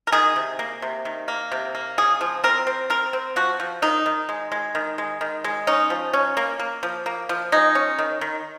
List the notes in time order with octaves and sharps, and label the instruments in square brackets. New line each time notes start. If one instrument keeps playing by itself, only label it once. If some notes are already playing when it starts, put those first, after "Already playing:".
[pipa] A#4
D#3 G#4
C3
A#3
C3
D#3
A#3
C3
A#3
C#3 G#4
F3
C4 A#4
C4
C4 A#4
C4
F3 F#4
F3
D#3 D#4
D#3
G#3
G#3
D#3
G#3
D#3
G#3
C#4 D#4
F3
C#4
A#3
A#3
F3
A#3
F3
G#3 D#4
C#4
D#3
D#3